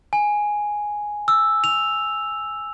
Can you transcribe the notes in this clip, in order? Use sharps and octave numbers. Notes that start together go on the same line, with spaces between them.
G#5
E6
F7